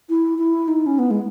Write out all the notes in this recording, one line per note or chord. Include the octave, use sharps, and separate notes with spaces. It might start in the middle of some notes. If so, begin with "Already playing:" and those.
E4
E4
D#4
C#4
B3
G#3